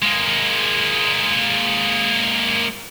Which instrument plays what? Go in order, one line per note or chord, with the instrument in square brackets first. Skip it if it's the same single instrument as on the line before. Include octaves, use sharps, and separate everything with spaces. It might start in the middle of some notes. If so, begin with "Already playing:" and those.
[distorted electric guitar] G#3 A#3